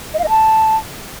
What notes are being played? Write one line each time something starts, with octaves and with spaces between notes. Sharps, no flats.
D#5
F5
D#5
A5